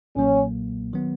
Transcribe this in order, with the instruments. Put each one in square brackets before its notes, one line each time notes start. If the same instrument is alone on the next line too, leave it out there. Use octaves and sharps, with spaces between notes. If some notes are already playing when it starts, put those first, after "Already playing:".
[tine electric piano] B1 A#2 F#3 A#3 [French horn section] C#4
[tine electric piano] D#3 F#3 B3